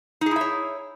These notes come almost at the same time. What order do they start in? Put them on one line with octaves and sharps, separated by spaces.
D#4 G#4 E4 E5 C#5